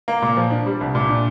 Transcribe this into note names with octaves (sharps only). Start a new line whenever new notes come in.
A#3
A#2
F3
D4
G3
C2
A#2
D4